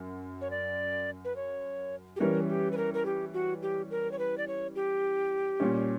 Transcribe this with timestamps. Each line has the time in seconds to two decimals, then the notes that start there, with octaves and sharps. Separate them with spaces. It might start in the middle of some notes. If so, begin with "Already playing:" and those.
Already playing: F#2
0.41 C#5
0.51 D5
1.25 B4
1.36 C#5
2.16 G4
2.20 E3 G3 C#4 A#4
2.49 G4
2.72 B4
2.77 A#4
2.94 A#4
3.06 G4
3.34 F#4
3.62 G4
3.91 A#4
4.12 C#5
4.19 B4
4.38 D5
4.48 C#5
4.75 G4
5.60 A#2 G3 C#4